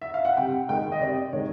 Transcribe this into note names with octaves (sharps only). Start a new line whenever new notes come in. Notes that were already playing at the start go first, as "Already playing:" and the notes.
E5
F5
F#5
C3 G5
D#3 G#3 G5
D#5
C3 D5
D#3 G#3 C#5